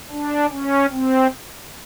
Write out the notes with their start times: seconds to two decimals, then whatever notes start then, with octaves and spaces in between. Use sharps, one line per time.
0.10 D4
0.50 C#4
0.91 C4